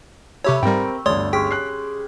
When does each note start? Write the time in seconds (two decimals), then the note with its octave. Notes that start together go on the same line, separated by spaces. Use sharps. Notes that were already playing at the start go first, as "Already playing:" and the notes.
0.44 C3 A3 G4 C#5 B5 E6
0.63 G#2 G3 C4 G4 A#4 G5
1.06 G1 D2 C#5 D5 C6 D#6
1.33 G#3 C#4 G4 G#4 G5 B6
1.51 F#6 C7